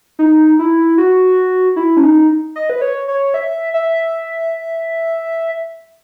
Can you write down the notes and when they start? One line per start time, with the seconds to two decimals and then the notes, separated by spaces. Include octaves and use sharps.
0.19 D#4
0.59 E4
0.98 F#4
1.76 E4
1.97 C#4
2.03 D#4
2.56 D#5
2.70 B4
2.82 C#5
3.08 C#5
3.34 E5
3.74 E5